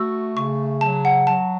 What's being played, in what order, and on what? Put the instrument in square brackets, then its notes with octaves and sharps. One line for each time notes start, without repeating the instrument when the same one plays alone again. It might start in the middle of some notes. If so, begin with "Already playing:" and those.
Already playing: [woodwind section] A3 F#4 [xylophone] E6
[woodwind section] C#3 [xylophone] C#6
[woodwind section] F#3 [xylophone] A5
[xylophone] F#5
[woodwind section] F#3 [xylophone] A5